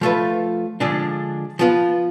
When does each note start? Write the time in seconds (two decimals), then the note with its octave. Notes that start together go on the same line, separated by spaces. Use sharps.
0.01 F3 A3 F4 B4
0.80 D3 F3 G#3 D4 G#4
1.59 F3 B3 F4